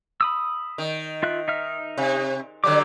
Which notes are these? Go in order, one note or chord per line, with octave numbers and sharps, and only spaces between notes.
B5 D#6 E6
D#3
F4 E5 F#6
D#4 E5 F6
C3
D3 F#3 G3 D6